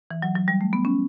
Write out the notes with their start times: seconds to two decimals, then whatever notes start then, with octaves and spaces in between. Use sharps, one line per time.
0.11 E3
0.22 F#3
0.36 F#3
0.48 G3
0.61 A3
0.73 B3
0.85 C#4